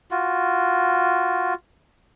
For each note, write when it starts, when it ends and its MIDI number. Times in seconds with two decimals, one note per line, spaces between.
0.11 1.54 65
0.11 1.54 66